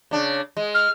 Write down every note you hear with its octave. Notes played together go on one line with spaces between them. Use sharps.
C#3 D4
G#3
F6